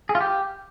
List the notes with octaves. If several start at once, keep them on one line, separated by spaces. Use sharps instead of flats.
G#4
F4
G4